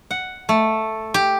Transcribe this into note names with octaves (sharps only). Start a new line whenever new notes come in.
F#5
A3
G4